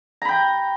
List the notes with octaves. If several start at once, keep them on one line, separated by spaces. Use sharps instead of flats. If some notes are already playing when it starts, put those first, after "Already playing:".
G5 A#5 B5